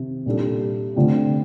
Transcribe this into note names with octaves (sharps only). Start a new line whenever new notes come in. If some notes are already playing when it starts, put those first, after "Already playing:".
Already playing: C3 D#3
A#2 G3 D4 A4
D3 A3 C4 F4